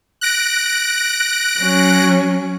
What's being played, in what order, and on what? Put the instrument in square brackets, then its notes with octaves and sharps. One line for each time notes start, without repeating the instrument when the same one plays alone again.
[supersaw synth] F#6 A#6 D7
[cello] F#3 C#4